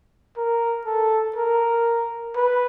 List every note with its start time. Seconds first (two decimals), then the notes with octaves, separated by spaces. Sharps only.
0.37 A#4
0.86 A4
1.36 A#4
2.36 B4